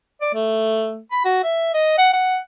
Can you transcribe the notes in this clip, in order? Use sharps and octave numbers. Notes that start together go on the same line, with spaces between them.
D5
A3
B5
F#4
E5
D#5
F#5
F#5